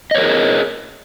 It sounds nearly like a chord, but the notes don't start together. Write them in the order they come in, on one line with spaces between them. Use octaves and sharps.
D#5 C#5 A#4 G#4